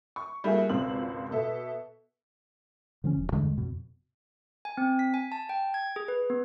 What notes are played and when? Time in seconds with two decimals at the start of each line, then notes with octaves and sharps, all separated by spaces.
0.16 C#6
0.44 G3 A3 A#3 E4 F#4 G#4
0.69 G#1 C#2 B2 C4 E6 F#7
1.31 B2 A4 E5
3.04 D3 F3 G3 C#4
3.17 E1
3.32 E2 G2 D3 G#3
3.57 F2 B2
4.65 G#5
4.77 C4
4.99 B6
5.14 G#5
5.32 A5
5.49 G5
5.74 G#6
5.96 G#4
6.08 B4
6.30 B3